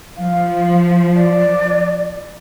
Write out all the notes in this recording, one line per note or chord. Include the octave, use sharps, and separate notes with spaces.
F3 F5
D5